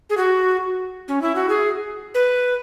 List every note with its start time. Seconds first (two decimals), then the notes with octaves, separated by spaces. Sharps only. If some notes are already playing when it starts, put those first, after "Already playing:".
0.10 G#4
0.17 F#4
1.08 C#4
1.22 E4
1.35 F#4
1.49 G#4
2.14 B4